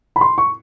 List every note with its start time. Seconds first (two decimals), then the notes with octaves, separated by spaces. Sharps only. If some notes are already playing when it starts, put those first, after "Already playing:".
0.16 B5
0.21 C6
0.38 C#6